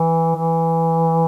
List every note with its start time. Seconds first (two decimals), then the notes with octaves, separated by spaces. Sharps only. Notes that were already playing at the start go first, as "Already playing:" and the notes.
Already playing: E3
0.36 E3